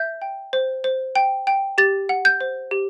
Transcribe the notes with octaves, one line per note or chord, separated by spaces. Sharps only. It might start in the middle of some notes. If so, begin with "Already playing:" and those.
Already playing: E5 G6
G5
C5
C5
G5
G5
G4 A6
F#5
G6
C5
G4